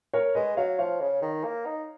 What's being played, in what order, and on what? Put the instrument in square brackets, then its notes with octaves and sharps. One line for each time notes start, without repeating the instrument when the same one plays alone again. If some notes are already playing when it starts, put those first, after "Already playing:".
[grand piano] A#4 C#5
[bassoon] G#3 [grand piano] B4 D#5
[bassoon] F#3 [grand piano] C#5 F5
[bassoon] F3 [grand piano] C#5 F5
[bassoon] C#3
D#3
A#3
D#4